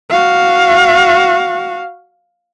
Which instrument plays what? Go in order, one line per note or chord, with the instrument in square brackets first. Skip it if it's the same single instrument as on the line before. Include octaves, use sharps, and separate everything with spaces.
[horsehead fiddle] F#4 F5